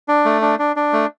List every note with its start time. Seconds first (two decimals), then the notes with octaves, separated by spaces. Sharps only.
0.08 D4
0.25 A3
0.41 D4
0.59 D4
0.76 D4
0.93 A3